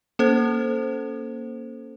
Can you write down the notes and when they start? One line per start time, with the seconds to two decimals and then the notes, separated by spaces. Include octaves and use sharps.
0.19 A#3 C#4 A4 C5